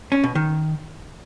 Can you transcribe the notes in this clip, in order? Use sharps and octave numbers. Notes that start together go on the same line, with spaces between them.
C#4
B2
D#3